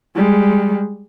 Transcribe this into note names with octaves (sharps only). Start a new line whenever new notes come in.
G3 G#3